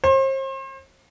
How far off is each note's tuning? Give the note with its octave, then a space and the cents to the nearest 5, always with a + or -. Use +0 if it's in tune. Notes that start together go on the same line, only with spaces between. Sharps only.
C5 +40